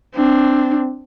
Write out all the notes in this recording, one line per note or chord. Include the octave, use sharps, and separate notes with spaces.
C4 D4